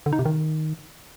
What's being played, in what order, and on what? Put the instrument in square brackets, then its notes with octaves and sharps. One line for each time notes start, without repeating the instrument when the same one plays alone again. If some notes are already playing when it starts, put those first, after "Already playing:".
[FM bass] D3
D#4
C3
D#3